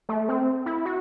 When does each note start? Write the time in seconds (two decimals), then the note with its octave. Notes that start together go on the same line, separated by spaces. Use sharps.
0.09 A3
0.29 C4
0.66 E4
0.85 F#4